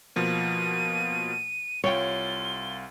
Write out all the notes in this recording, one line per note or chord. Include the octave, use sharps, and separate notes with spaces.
B2 F3 A#3 D#7
C2 F4 C#5 G5 G7